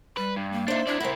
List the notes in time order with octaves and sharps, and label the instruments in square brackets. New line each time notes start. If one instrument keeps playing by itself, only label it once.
[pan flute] G3 [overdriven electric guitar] B4
[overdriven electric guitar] G2
[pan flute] A#3
[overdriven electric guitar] D4 D#4 [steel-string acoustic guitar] C5 E5
[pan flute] D4 [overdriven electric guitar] E4 D5
[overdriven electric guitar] E4 A#4 [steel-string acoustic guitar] C5 F#5 [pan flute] E5